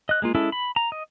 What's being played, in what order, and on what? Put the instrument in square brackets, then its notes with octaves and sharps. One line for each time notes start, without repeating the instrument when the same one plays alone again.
[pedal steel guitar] D#5 F#6
G#3 A#3 F4
G#3 C#4 E4 A4
B5
A#5
D#5